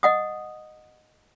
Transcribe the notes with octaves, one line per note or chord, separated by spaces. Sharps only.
D#5 F#5 D#6